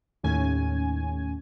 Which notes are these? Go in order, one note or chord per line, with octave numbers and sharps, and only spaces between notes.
D#2 A2 C#4 G#5